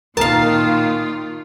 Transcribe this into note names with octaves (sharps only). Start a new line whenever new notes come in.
A#2 D#3 F4 A#4 F5 A5